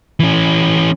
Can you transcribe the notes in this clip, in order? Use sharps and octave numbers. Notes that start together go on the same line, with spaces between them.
E3 C#4